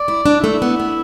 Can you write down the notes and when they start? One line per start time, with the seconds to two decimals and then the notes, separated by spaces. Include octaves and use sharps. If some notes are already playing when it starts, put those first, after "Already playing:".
Already playing: D5
0.08 E4
0.26 D4
0.44 A3 E4
0.62 B3
0.80 B3